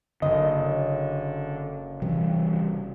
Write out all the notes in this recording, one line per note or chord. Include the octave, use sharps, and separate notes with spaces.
F#1 D3 D#5
C3 E3 G3